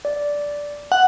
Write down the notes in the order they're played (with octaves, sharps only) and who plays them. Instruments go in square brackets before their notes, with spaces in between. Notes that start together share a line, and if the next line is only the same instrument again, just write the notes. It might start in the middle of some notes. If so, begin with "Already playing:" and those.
[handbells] D5
[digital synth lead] F#5